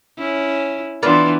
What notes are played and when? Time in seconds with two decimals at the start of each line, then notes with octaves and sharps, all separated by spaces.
0.18 C#4 E4
1.03 E3 B3 D4 F4 B4 D5